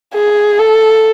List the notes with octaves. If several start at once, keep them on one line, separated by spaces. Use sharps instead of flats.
G#4
A4